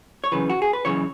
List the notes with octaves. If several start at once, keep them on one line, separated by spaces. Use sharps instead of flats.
C#5
F#2 C#3 E3 B4
F#4
G#4
B4
F#2 C#3 E3 C#5